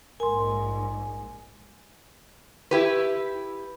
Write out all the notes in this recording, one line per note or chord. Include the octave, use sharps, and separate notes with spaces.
A#1 G#2 A#4 G#5 C6
E4 G4 B4